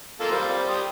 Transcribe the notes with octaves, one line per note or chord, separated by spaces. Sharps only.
A#3 F4 A4
G3 C5
G4 D#6